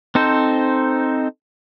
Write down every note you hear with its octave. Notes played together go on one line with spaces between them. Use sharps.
C4 D#4 A4 C5